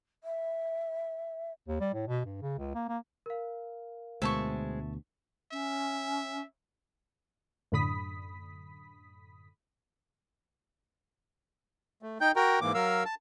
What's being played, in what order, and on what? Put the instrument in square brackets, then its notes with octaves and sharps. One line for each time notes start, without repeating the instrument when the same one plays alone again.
[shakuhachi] E5
[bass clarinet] D#2
G3
A2
B2
G2
C#3
C#2
A#3
A#3
[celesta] A#4 F5
[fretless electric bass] D2 B2 [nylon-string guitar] G#3 C5 [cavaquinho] E5 A5 C#6
[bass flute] C#4 [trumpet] E5
[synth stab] F#2 A2 D3 B5 D#6 B6
[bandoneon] A3
D#4 G5 G6
F#4 A#4 G5 A#5
G#2 E3 A#3 D6
F#3 A#4 F5 E6
A5